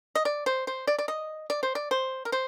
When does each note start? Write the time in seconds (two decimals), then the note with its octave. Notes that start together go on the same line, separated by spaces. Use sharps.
0.15 D#5
0.25 D5
0.46 C5
0.67 C5
0.87 D5
0.99 D5
1.08 D#5
1.50 D5
1.63 C5
1.75 D5
1.91 C5
2.25 A#4
2.32 C5